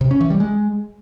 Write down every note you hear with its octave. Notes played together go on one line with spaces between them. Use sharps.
C3
C#4
E3
G3
G#3